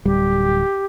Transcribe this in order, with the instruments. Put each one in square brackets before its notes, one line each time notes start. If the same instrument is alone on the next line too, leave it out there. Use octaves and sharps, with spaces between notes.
[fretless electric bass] D1 G3 [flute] G4